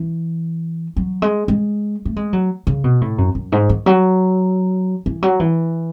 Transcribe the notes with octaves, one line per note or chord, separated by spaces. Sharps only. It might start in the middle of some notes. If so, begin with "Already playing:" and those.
Already playing: E3
F#3
G#3
G#3
A3
G#3
F#3
C#3
B2
A2
F#2
F#2
G#2
D#3
F#3
E3
F#3
E3